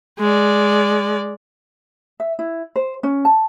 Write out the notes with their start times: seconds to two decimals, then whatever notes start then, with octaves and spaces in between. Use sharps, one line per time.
0.19 G#3 D5
2.20 E5
2.39 E4
2.76 C5
3.03 C#4
3.25 A5